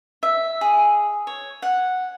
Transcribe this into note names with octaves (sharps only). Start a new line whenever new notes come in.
E5
G#4
C#5
F#5